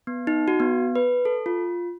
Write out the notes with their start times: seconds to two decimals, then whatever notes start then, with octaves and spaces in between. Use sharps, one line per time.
0.07 B3
0.27 D#4
0.48 F#4
0.60 B3
0.96 B4
1.25 A4
1.46 F4